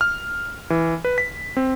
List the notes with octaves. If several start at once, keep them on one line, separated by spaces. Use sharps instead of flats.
F6
E3
B4
B6
C4